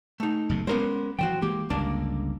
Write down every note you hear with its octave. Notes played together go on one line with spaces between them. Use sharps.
A3 D#4
F#1 B1 C3
G#3 A3 B3 C#4 A#4 C5
G2 E3 F3 F#4 C5 G5
E3 G#3 A#3 G4
G1 C#2 A#3 D4